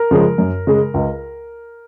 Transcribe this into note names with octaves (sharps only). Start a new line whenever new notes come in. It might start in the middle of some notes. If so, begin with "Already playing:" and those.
Already playing: A#4
C#3 F3 G#3
F#2
C#3 G#3
C#2